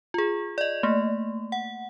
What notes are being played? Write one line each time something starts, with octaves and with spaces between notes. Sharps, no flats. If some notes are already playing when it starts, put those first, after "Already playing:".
F4 G#4
D5 D#5
A3 A#3
F#5